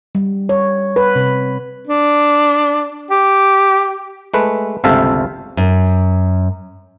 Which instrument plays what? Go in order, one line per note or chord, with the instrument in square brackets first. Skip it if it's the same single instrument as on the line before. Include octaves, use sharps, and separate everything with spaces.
[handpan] G3
C#5
B4
C3
[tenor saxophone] D4
G4
[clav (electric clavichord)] G#3 A3 B4
G1 C#2 C3 A4 E5 F5
[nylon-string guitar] F#2